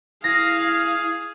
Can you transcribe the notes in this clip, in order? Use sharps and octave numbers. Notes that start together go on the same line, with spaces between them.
E4 G#4 F5 A#6